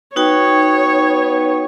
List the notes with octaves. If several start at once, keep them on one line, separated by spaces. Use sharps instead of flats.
B3 D#4 F#4 C#5 G5